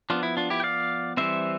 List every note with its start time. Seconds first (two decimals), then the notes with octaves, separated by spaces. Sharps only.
0.10 F3 B3 D4 F4
0.23 E4
0.37 D4 F4
0.50 E4 G4
0.60 G5
0.64 D5 F5
1.17 E3 G3 C4 C5 E5